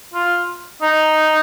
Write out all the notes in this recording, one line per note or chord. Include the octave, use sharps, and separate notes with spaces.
F4
D#4